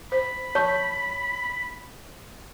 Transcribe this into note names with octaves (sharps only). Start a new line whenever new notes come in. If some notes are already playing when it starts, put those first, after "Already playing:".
C5 B5
C#5 A5 C#6